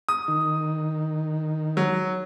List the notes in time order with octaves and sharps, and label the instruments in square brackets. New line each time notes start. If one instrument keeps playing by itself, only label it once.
[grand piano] D#6
[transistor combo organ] D#3
[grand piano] F#3